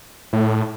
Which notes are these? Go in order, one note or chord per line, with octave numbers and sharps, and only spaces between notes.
A2